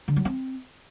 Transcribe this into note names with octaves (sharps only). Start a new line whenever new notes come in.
D3
F#3
C4